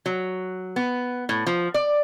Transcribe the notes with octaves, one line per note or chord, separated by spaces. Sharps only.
F#3
B3
A2
F3
D5